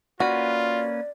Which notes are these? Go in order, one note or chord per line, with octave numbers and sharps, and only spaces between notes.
A#3 C#4 F4 F#4 B4 D5